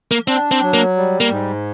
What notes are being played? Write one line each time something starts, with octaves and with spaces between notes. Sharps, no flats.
A#3
C4 D4
C4
F#3
A#3
G3
A#3
G#2